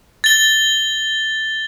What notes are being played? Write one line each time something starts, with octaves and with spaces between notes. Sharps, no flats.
A6 G7